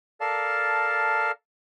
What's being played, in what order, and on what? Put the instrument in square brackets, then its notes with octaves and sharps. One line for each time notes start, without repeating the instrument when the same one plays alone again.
[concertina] A4 A#4 D5 F5 A5